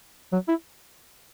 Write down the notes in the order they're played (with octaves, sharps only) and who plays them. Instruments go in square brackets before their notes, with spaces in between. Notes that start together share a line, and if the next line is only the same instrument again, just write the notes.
[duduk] F#3
E4